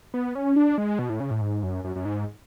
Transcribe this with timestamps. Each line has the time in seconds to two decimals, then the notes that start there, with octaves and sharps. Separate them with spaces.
0.14 B3
0.35 C#4
0.56 D4
0.78 G#3
0.99 B2
1.10 A2
1.20 C#3
1.31 A2
1.41 G#2
1.63 F#2
1.84 F#2
1.96 F#2
2.05 G#2